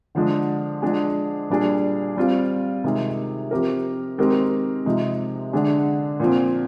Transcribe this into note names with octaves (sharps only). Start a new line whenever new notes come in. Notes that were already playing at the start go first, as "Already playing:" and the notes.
D3 F3 G#3 D4
F3 G#3 D4 G#4
A#2 G3 D4 G#4
G3 C4 F4
C3 D#3 G#3 D#4 G#4
F3 C4 G4 A#4
D#3 G#3 C4 G4 A#4
C3 F3 G#3 D#4
D3 G#3 D4 G#4
A#2 F3 C4